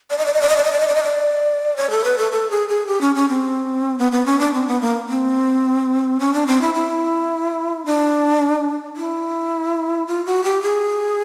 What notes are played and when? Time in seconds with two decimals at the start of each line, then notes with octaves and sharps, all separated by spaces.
0.10 D5
0.18 D#5
0.26 D5
0.34 D#5
0.42 D5
0.49 D#5
0.57 D5
0.64 D#5
0.72 D5
0.80 D#5
0.88 D5
0.95 D#5
1.03 D5
1.77 C#5
1.90 A4
2.04 B4
2.18 A4
2.32 A4
2.51 G#4
2.69 G#4
2.87 G4
3.01 C#4
3.15 C#4
3.29 C4
3.99 B3
4.12 B3
4.26 C#4
4.39 D4
4.53 C4
4.67 B3
4.81 A#3
5.09 C4
6.20 C#4
6.33 D4
6.47 C4
6.61 E4
6.74 E4
7.86 D4
8.96 E4
10.07 F4
10.26 F#4
10.44 G4
10.62 G#4